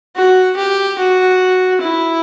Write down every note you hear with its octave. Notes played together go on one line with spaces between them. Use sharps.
F#4
G4
F#4
E4